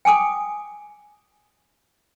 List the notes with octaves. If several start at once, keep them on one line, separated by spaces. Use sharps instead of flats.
G5 G#5 D6 D#6